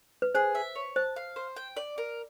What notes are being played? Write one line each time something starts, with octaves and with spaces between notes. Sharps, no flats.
B4
G#4 C5
E5
C#5
C5 A5
F5
C5
G5
D5
A#4